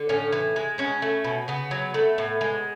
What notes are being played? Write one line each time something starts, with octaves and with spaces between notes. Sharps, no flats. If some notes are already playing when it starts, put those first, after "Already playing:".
Already playing: D3
A2 C#4
E3
G#3
B2 C#4
A3
B2
C#3 B3
F#3
A3
A2
G#3